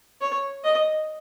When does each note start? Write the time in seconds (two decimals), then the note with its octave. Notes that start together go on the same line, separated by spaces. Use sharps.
0.21 C#5
0.64 D#5